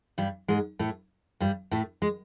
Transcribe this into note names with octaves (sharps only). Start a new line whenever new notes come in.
G2 G3
G#2 G#3
A2 A3
G2 G3
A2 A3
G#3